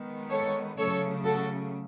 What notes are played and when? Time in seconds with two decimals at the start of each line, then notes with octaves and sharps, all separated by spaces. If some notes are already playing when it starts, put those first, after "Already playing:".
Already playing: D#3 G#3 B3
0.30 A4 C#5
0.77 C#3 F#3 A3 A4 C#5
1.24 F#4 A4